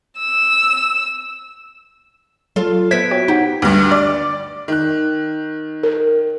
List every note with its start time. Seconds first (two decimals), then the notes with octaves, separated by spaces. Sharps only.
0.19 E6
2.56 F#3 F4 A4
2.91 B3 C5 E5 G#6 B6 D7
3.11 F#4 C#5 G5
3.28 D#4 G4 F#5
3.62 D2 G2
3.91 D5
4.68 D#3 F#6
5.83 A#4